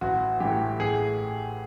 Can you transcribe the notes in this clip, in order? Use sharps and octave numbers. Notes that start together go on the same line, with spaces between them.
A1 F#4
A2 E3 G4
A1 G#4